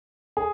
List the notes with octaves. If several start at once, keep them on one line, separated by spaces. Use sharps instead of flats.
G#4